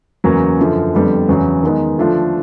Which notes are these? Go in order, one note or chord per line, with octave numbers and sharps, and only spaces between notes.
E2 C#3 F#3 A#3 C#4
F#2 D3 F3
F2 D3 G3 B3
E2 C#3 F#3
D#3 G#3 B3 D#4
D3 F3 A3 D4 F4